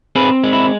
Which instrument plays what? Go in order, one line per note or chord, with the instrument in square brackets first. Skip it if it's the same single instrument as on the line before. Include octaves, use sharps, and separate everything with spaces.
[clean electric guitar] C4 G#4 B4
G#3
E4